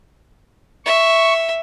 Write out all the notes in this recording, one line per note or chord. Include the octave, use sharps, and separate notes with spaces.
E5 C#6